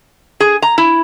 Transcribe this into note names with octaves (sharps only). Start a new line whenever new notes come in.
G#4
A#5
E4